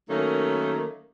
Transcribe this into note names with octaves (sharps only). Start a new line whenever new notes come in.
D#3 F#3 A3 A#3 C#4 D#4